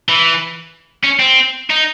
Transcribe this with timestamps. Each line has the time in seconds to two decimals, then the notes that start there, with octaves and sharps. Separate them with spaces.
0.09 E3
1.04 C#4
1.19 C4
1.70 D#4